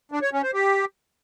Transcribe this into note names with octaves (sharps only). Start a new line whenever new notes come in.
D4
C#5
C#4
C5
G4